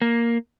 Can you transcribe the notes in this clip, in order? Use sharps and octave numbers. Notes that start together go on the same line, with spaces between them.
A#3